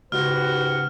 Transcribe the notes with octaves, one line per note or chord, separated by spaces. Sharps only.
C#2 G#2 F#4 G4 B4 F6